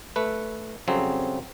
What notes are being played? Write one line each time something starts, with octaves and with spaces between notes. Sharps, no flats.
A3 B4
F2 C#3 F#3 G3 C4